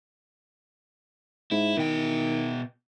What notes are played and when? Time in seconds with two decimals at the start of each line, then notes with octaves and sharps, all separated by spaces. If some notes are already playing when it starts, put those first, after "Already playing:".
1.51 G#2 E4
1.77 B2 D#3 G5